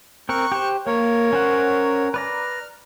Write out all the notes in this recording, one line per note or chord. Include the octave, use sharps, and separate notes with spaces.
C4 A#4 C#6 F#6
G4 C5
A#3 A#4 C#5
C#4 C5 F#5
B4 D5 A#5 F6